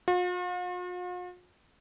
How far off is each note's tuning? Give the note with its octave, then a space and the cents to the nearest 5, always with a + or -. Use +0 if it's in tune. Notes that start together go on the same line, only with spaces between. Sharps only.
F4 +45